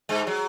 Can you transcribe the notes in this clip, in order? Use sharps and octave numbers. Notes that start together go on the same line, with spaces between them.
G#2 G#3
F#3